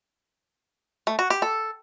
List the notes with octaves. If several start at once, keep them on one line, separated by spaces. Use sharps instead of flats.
A3
F#4
G4
A4